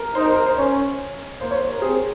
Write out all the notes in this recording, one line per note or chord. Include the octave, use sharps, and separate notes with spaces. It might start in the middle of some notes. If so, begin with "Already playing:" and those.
Already playing: A#4
D#4 C5
A#4
A#4
C5
C#4 C#5
A#3 C5
C#5
C5
A#4
C4 G#4